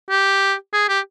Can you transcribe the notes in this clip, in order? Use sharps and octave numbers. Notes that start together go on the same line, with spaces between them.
G4
G#4
G4